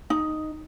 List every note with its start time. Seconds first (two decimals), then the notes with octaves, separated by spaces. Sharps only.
0.10 D#4